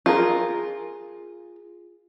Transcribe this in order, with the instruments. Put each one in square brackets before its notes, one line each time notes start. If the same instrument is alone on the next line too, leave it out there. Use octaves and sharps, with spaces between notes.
[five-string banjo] F4 G#4 A#4